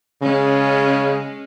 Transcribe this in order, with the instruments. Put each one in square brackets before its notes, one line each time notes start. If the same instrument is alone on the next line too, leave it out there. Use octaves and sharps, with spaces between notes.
[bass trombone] C#3 [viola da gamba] G#3 C#4